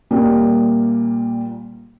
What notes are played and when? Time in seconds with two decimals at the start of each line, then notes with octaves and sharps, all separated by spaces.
0.11 A#2 G3 A#3